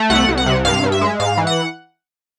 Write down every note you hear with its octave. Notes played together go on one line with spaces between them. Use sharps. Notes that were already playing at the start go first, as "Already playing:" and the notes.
Already playing: A3
C2 F#5
C2
F#5
C3
G2 F5
G2
E5
G#3
G#2 F5
E3
F#5